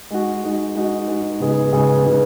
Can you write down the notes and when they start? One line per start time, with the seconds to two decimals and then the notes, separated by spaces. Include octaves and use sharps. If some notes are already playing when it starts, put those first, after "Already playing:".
0.11 G#3 D#4 F#4
0.44 G#3 D#4 F#4
0.75 G#3 D#4 F#4
1.08 G#3 D#4 F#4
1.40 C#3 G#3 B3 D#4 G#4
1.73 C#3 G#3 B3 D#4 G#4
2.05 C#3 G#3 B3 D#4 G#4